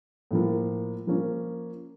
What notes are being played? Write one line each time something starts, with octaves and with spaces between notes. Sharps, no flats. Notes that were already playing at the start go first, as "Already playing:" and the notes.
A2 F3 A#3
F3 A#3 C#4